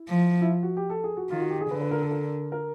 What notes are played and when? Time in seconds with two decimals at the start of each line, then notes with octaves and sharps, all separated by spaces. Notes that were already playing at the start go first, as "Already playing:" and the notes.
Already playing: E4
0.08 F3
0.41 E4
0.49 F4
0.63 F#4
0.77 G4
0.90 A4
1.04 G#4
1.17 F#4
1.30 D#3 F4
1.41 F#4
1.50 G4
1.61 G#4
1.71 D3 B4
1.81 B4
1.91 A#4
2.02 A4
2.11 A#4
2.52 A#4